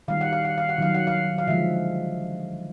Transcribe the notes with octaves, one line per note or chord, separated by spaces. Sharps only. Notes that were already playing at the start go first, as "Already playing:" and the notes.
D#3 G3 A#3 F5
F#5
F5
F#5
F5
F#5
D#3 F#3 A#3 F5
F#5
F5
F5
D3 F3 G#3 E5